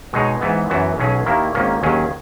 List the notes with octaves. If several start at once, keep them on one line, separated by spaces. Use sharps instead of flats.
B2 G#3 D#4 G#4 C#5
G#2 E3 B3
F#2 E3 B3 F#4
B1 B2 F#3 C#4 G#4
D#2 D#3 A#3 E4
G#1 G#2 D#3 A#3 C#4
D#2 D#3 F#3 C#4 G#4